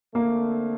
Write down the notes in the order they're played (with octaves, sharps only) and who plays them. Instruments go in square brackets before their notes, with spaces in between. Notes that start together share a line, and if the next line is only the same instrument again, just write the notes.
[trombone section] D3 A3 C4 [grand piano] A#3